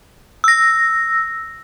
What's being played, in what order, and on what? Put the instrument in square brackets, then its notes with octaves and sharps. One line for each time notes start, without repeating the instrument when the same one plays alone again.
[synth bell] E6 A#6